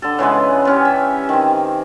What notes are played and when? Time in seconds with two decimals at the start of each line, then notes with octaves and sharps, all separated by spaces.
0.02 D3 A4
0.19 C#3 E3 G#3 B3
0.65 B3 C#4 G4
0.85 E5
1.29 D#3 C4